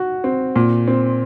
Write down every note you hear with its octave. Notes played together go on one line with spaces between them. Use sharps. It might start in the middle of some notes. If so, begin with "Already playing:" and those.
Already playing: F#4
C4
A#2
C4